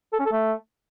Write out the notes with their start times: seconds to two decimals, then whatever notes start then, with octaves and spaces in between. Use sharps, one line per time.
0.13 A4
0.19 C#4
0.26 A4
0.32 A3